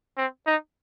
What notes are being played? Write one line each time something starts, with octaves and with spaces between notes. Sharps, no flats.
C4
D#4